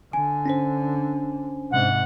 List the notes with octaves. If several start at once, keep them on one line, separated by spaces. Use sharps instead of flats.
D3 G#5
C#4 D4 C5
G#2 C3 F#5